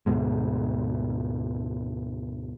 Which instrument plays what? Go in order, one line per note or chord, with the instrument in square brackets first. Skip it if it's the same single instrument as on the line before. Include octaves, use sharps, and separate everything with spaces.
[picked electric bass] D2 G#2 B2 G#3